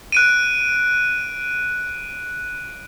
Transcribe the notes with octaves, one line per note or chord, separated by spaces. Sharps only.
F#6 D7 D#7